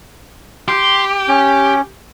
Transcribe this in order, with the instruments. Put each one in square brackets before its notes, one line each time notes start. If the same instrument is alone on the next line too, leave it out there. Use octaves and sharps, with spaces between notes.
[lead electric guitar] G4 [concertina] C6
[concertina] C#4